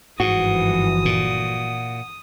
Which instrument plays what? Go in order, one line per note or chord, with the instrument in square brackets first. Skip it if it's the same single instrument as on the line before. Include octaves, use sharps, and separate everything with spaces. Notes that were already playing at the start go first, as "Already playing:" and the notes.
[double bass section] G1 E3 F3 [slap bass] G#2 [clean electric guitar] F#4 [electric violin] D#6
[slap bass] A#2